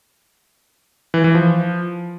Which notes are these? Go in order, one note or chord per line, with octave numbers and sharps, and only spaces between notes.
E3
E3
F3